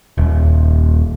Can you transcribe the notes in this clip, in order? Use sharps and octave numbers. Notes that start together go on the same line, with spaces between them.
D#1